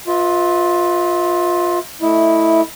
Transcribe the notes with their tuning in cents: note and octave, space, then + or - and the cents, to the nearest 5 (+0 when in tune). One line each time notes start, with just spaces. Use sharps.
F4 +15 B4 +5 E5 -40
A3 +0 E4 -5 D#5 +0